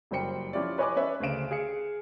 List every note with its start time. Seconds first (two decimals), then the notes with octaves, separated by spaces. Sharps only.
0.11 F#1 F#3 G3 C5 G5 C#7
0.53 F3 C#4 E4 F4 G4 D5
0.78 B4 C#5 D#5 G#5 D6 F#6
0.96 C#4 B4 C#5 D5 E5
1.20 D2 C#3 C5 F5 D7 E7
1.51 G#4 F5 C#7